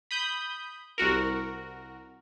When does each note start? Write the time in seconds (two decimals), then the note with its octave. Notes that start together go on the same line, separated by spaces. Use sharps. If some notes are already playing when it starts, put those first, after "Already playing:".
0.11 B5 D#6 G6
0.98 C2 F#4 A#4